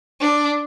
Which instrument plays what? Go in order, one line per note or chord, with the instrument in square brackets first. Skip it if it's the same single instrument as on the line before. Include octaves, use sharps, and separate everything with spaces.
[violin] D4